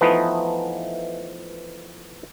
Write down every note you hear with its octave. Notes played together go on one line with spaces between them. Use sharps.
E3 F3 A3 B3 D#4 B4